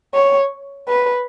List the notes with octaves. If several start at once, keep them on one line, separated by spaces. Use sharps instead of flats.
C#5
B4